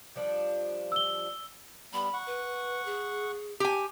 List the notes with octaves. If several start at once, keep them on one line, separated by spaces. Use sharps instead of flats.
F3 G3 D4
E6 G7
G3 B3 B5
F#5 C#6
B4
G#4
G4 G#5